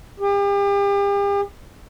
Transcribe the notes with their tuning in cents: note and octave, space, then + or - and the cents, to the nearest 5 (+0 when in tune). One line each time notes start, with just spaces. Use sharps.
G4 +40